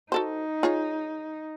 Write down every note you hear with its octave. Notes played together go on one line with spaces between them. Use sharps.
D#4 F#4 A4 C5
F4 G#4 C#5